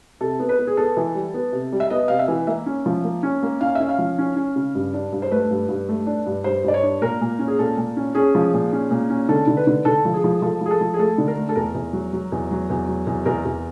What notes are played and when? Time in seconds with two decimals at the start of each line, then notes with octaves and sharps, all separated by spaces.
0.21 C3 A4
0.39 B3
0.49 B4
0.59 B3
0.67 G#4
0.77 B3 A4
0.97 E3
1.15 G3
1.34 B3
1.52 C3
1.72 G3
1.80 E5
1.90 B3 D#5
2.08 C3 F5
2.19 E5
2.28 E3
2.47 A#3 E5
2.66 C#4
2.86 F3
3.04 A#3
3.23 C#4
3.43 A#3
3.61 C#4 F5
3.75 C#4 E5
3.89 F5
3.98 F3
4.18 C#4
4.36 C#4
4.56 C#3
4.75 G2
4.94 D4
5.12 G2
5.22 C5
5.31 A3 B4
5.51 G2
5.69 G2
5.88 A3
6.07 D4
6.26 G2
6.44 G2 C5
6.64 G2 D5
6.74 C#5
6.83 D4
7.02 A#2 A#4
7.21 A#2
7.39 C#4
7.48 G#4
7.59 A#2 A4
7.77 A#2
7.97 C#4
8.15 C#4 G#4
8.35 F3
8.54 A#2
8.73 C#4
8.91 A#2
9.09 C#4
9.29 D3 A4
9.47 D3
9.57 B4
9.67 D3
9.85 D3 A4
10.05 F3
10.14 G#4
10.24 F3
10.42 F3 A4
10.61 F3 G#4
10.71 A4
10.81 F3
10.94 G#4
10.99 A3 A4
11.18 D3
11.28 A#4
11.37 A3
11.49 A4
11.56 E2 A#4
11.75 E2
11.93 F#3
12.13 F#3
12.32 E2
12.51 F#3
12.70 E2
12.88 F#3
13.07 E2
13.26 E2 A#4
13.45 E2